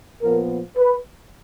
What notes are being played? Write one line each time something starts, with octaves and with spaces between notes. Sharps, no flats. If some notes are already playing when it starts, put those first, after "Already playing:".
A#2 F3 B3 A#4
B4